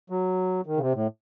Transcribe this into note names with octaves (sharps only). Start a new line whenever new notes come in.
F#3
D#3
C#3
C3
A2